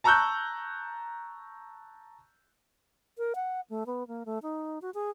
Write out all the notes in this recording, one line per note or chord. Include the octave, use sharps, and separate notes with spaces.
A5 A#5 C#6 E6 F#6 G6
A#4
F#5
A3
B3
A#3
A3
D#4
F#4
G#4